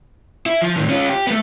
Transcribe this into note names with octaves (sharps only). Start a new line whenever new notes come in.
E4
F3
A2 D#3
C#4 F4
G4
A3 B3